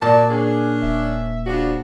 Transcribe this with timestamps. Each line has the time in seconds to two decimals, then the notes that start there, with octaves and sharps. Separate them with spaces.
0.02 A#2 A#3 F#4 A5
0.30 C#4 D4 G#4
0.83 D#1 E5
1.46 C#3 F3 D4 F#4